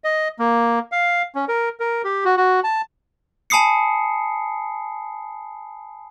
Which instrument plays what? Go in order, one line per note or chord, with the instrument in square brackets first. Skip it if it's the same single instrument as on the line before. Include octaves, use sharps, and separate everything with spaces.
[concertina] D#5
A#3
F5
C#4
A#4
A#4
G4
F#4
F#4
A5
[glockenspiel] G#5 A5 B5 D#6 C7 C#7